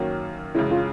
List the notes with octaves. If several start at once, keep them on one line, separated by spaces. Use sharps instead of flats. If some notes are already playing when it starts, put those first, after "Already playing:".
Already playing: F#2 D#3 F#3 A#3 C#4
F#2 C#3 E3 G#3 C#4 E4
F4